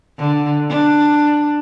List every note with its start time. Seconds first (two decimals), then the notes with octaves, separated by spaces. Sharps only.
0.18 D3
0.69 D4